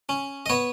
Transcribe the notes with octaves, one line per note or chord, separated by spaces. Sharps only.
C#4
D#5
B3 C#5